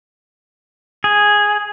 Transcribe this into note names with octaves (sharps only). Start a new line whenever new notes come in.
G#4